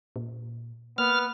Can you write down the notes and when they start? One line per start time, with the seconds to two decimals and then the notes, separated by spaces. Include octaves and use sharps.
0.16 A#2
0.98 A#3 B3 F6